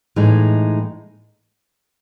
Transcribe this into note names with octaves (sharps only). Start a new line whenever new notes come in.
A2 E3 G#3 D#4